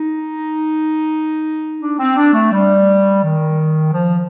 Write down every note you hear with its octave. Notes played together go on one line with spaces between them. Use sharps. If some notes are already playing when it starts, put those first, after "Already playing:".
Already playing: D#4
D4
C4
D4
A3
G3
D#3
F3